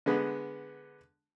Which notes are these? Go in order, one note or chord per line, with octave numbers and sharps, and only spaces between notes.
D3 G#3 B3